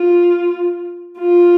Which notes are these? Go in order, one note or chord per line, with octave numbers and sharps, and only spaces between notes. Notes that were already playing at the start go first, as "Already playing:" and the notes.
Already playing: F4
F4